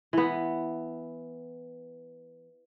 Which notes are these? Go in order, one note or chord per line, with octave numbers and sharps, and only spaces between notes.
E3 B3